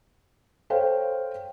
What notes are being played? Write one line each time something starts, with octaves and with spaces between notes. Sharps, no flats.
A4 C5 C#5 F5 G5